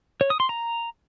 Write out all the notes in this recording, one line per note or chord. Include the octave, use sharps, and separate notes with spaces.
C#5
D#6
C6
A#5